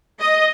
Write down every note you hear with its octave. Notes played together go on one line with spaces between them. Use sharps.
D#5